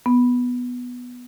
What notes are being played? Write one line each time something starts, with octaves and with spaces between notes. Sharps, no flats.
B3